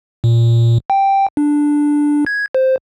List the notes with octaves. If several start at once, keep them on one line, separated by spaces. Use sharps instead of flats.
A#2
G5
D4
G#6
C5